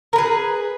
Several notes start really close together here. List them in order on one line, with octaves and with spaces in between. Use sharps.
A#4 B4 G#4